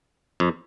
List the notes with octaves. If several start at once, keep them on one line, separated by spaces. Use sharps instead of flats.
F2